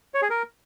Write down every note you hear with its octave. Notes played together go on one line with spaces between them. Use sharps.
C#5
G#4
A#4